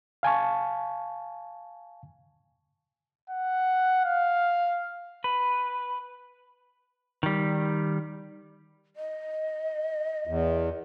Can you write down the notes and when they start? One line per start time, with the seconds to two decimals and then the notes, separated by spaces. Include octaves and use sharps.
0.23 F5 G#5 A5 C#6
3.30 F#5
4.04 F5
5.24 B4
7.23 D#3 G3
8.96 D#5
10.27 E2